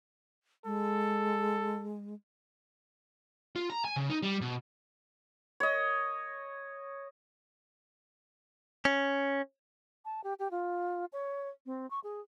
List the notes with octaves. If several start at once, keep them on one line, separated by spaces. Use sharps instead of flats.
G#3 A4
F4
A#5
G#5
C#3
D#4
G3
B2
C#5 D#5
C#4
A5
G4
G4
F4
C#5
C4
C#6
G#4